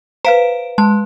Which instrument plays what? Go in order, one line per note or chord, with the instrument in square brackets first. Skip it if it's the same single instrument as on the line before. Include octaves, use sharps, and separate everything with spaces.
[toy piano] B4 F5 A#5 [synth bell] C5 D7
[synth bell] G#3 [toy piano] A5